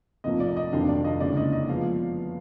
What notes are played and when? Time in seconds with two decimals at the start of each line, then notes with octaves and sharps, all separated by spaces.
0.24 F1 F2 F3 A#3 D#5
0.40 D5
0.57 D#5
0.72 F1 F2 D#3 F#3 D4 F5
0.89 D5
1.04 D#5
1.20 F#1 F#2 D3 G#3 D5
1.37 D#5
1.53 D#5
1.68 F3 G#3 B3 F5